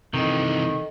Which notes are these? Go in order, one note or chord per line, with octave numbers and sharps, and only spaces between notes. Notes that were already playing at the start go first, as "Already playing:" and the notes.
C3 D#3 E3 A4 D#5